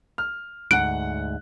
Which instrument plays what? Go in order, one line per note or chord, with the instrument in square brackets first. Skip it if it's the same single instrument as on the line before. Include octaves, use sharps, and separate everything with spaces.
[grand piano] F6
[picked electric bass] D2 G#2 [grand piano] F#5 F#6 [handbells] D7